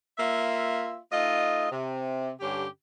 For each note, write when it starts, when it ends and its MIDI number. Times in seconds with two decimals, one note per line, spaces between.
0.18 0.97 58
0.18 0.97 65
0.18 0.97 76
1.11 1.68 57
1.11 1.68 63
1.11 1.68 65
1.11 1.68 75
1.70 2.30 48
2.40 2.66 43
2.40 2.66 50
2.40 2.66 61
2.40 2.66 67